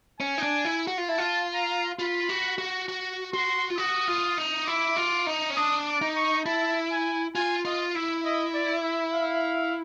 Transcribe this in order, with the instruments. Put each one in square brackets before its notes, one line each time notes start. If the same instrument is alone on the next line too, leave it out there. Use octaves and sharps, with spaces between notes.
[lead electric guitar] C#4 [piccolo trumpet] G#5
[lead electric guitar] D#4
D4
E4
F#4
F4
[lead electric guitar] E4 [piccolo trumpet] A5
[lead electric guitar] F4
[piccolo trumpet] A#5
[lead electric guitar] F4 [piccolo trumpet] B5
[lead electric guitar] F#4
F#4
F#4
[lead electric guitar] F#4 [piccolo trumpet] C6
[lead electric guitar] F4
[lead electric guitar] F#4 [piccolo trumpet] D#6
[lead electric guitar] F4
D#4
[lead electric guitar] E4 [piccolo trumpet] D6
[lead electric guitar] F4
D#4
C#4
[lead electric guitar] D4 [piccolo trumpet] D#6
[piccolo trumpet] D6
[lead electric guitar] D#4
[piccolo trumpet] C#6
[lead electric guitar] E4 [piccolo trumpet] A5
[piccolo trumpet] G#5
[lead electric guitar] F4 [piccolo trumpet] G#5
[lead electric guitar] F4 [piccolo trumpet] D#5
[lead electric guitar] E4 [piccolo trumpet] E5
[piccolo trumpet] D#5
D5
E5
F5